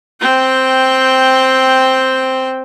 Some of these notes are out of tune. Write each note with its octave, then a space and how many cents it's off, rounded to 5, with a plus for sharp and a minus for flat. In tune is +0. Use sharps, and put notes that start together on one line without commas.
C4 +0 G5 +0